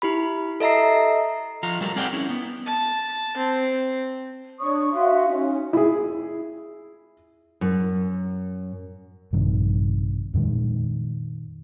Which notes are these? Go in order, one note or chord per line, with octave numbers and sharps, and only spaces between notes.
E4 G4 B5
A4 D#5 E5 A#5 C7
F3 F4 A#5
F#3 G3 A4 A#4
C4 G#4 A#4 D5 F#5 G5
C#4 E4
B3
A5
C4
D4 C#5 C#6 D#6
F#4 E5 F5 C6
C#4 D#4
E4 G#4
F#2
A#1 G2 C3 D#3
F2 A#2 D#3 G#3